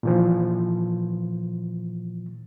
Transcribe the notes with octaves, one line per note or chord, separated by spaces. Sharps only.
A#2 E3 F3